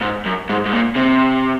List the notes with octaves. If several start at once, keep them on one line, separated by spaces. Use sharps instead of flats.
G#2
F#2
G#2
G#2
A#2
C3